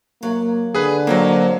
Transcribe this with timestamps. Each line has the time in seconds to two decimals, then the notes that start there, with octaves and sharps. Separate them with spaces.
0.23 F#3 A#3
0.75 D3 G#4 B4
1.07 F2 F#3 A#3 C5 F5